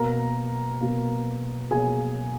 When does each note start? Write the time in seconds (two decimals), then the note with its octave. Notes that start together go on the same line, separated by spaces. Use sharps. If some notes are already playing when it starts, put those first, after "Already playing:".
Already playing: B2 A#3 A#4 A#5
0.81 B2 A#3
1.71 B2 A#3 G#4 G#5